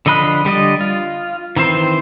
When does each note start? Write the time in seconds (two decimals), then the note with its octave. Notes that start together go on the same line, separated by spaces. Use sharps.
0.06 D3 F3 D#5 B5 F#6
0.45 D3 G3 D5 D#5
0.81 F4
1.56 D#3 E3 C4 C5